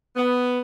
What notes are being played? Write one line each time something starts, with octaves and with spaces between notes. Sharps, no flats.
B3